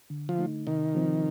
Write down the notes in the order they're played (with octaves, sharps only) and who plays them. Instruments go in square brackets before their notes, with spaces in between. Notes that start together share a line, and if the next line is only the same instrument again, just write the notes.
[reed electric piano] D3
[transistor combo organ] F3
[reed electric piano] A3 D#4
[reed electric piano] C3 [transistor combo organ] D#3
[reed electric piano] F3 C4